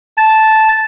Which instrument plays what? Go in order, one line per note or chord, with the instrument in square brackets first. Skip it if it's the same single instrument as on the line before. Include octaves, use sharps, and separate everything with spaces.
[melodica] A5